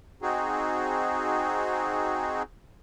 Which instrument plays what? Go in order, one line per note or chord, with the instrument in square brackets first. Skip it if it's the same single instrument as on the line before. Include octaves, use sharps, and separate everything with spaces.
[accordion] C4 D#4 F#4 G#4